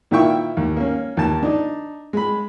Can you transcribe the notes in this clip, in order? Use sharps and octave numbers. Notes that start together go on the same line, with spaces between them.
A#2 D#3 E4 E5 G5 C#6
D#2
A#3 C#4
D#2 A5
D4 D#4
G#3 B5